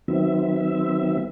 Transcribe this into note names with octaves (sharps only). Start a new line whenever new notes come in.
D#3 F#3 B3 C4 E5